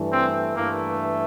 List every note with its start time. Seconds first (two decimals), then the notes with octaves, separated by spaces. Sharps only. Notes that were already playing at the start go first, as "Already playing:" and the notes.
Already playing: G2 E3 A3
0.12 C4
0.57 G2 E3 A3 A#3